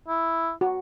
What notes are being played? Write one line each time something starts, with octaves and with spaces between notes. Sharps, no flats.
E4
F#4